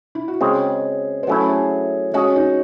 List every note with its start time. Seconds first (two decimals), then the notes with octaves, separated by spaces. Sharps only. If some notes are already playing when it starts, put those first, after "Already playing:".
0.15 E4
0.28 F#4
0.41 C#3 G#3 C4 G#4
1.23 C5
1.27 F#3 A3 C#4 E4 A4
1.49 G#4
2.14 G#3 C#4 F#4 G#4
2.36 D#4